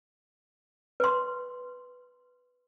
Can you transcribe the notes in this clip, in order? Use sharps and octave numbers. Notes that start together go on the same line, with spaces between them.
B4 C6